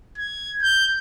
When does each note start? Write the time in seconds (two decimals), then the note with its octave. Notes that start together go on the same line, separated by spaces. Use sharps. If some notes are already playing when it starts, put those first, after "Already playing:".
0.18 G#6
0.62 G6